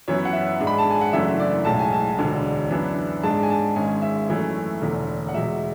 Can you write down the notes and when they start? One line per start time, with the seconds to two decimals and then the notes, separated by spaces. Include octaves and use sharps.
0.08 F#2 E3 B3 C#5
0.25 F#5
0.33 E5
0.60 G#2 G#3 D4
0.67 B5
0.78 A5
0.90 G#5
1.01 F#5
1.13 F#1 F#2 E3 A3 D4 E5
1.40 D5
1.65 B1 A2 G#3 A5
1.79 G#5
1.93 A5
2.18 E1 D2 D3 G#3 D4
2.70 F#2 E3 B3 D4
3.23 G#2 G#3 D4 A5
3.43 G#5
3.50 A5
3.76 G#1 G#2 G#3 C#4 G#5
4.02 E5
4.29 F#2 E3 A3 C#4
4.82 E1 E2 D3 A3
5.28 F#5
5.34 E2 B2 G#3 E5